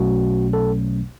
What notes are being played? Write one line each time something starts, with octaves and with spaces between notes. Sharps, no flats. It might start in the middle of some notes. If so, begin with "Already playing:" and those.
Already playing: B1 B2 F#3 A3 C#4 F#4
A4